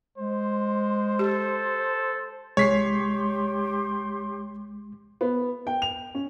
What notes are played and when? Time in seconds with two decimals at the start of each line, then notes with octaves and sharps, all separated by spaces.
0.18 G#3 C5
1.19 G4 A4
2.57 C2 G#3 G4 C#5 C6 B6 C7
5.21 B3
5.67 G5
5.82 F7
6.15 C#4